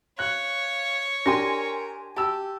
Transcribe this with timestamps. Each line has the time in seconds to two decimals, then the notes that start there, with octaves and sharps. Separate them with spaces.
0.19 C#5 F5 F#6
1.26 D4 G4 A#4 G#5 C6 A#6
2.16 G4 A5 E6